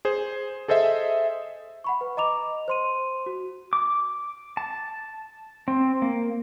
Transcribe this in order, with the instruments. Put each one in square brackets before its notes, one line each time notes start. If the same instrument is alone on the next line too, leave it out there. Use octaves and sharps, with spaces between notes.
[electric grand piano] G#4 C5
G#4 A4 C5 D#5 E5
[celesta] F#5 B5 C#6
B4
D#5 A#5 D6 F7
C5 C6 D#7
F#4
[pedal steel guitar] D6
A5
C4
A#3